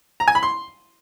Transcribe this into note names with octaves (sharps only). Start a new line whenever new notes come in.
A#5
G#5
B5
C6